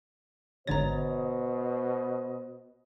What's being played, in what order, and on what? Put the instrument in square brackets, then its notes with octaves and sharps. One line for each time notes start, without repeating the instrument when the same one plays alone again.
[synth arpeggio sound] G#1 D3 A6 [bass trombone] B2 [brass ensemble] C5 D#5 [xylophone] C#5 A#5